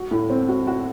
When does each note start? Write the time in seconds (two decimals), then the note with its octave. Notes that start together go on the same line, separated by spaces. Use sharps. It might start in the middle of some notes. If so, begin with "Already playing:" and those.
Already playing: F#4
0.11 A2
0.30 C4
0.49 F#4
0.67 F#4